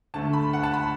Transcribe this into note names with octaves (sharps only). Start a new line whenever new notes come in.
D2 D3 A3 A5
B5
F#5
A5
B5